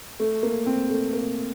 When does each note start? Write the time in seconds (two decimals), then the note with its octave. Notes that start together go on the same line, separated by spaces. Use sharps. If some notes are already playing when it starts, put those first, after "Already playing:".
0.20 A3
0.43 A#3
0.66 C4
0.90 A3
1.13 A#3